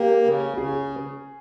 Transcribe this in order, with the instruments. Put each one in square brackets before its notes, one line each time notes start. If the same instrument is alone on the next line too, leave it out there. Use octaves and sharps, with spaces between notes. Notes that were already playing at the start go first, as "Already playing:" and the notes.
Already playing: [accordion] A#3 [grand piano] G4
[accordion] C#3
[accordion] C#3 [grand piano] G#4